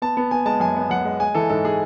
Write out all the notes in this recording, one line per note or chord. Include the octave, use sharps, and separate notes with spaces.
B3 A5
B3
B3 G#5
G#3 A5
F#2 G#5
B3
F#2 F#5
G#3
G#3 G#5
E3 A4
G#2 A4
G#4